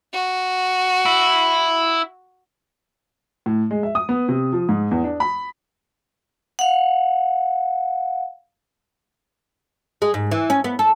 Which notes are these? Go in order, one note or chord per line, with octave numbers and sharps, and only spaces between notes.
F#4
E4
A2
G#3
E5
D#6
B3
C3
F3
G#2
E2
D4
B5
F5 F#5
G#3
G#2
E3
C#4
B3
A4